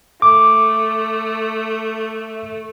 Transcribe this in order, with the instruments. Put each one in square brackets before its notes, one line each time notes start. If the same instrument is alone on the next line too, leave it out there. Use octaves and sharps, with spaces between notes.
[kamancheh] A3 [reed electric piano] D6